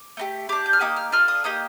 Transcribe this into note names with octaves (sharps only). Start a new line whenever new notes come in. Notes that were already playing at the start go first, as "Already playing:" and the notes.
Already playing: D6
A3 D#4 G4
D4 G4 D6
G6
F6
A#3 D#4 G4 D#6
F6
D4 F4 A4 F6
D#6
A#3 D#4 G4 D#6